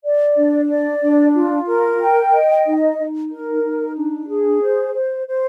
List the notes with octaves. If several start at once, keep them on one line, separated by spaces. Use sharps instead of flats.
D5
D4
D5
D4
F4
A#4
G5
D#5
D#4
D#4
A#4
D#4
D4
G#4
C5
C5
C5